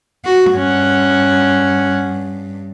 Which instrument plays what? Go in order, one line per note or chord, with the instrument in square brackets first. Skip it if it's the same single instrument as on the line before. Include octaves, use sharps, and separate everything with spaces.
[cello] F#4
[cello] G2 [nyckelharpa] C#4 F#5